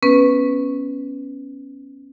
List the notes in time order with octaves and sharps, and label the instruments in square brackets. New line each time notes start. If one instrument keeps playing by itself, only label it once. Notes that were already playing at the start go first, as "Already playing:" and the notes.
[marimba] B3 C#4 B4